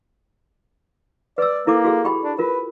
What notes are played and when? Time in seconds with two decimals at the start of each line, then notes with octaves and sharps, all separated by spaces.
1.38 B4 D5 E6
1.67 A#3 E4 A4 D6
1.85 F#4 G#4
2.04 G4 G5 B5
2.24 D4
2.39 F4 A#4 B4